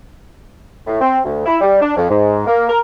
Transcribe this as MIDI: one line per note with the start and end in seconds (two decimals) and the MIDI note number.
0.87 1.00 45
1.01 1.19 60
1.25 1.45 38
1.46 1.56 64
1.61 1.81 55
1.82 1.95 62
1.97 2.08 41
2.10 2.45 44
2.47 2.67 58
2.69 2.79 70